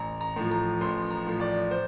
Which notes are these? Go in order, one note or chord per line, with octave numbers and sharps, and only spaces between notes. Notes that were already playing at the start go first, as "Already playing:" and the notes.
Already playing: A1 A#5
A#5
A2 F3
A#5
A1 C6
A#5
A2 F3
D5
C5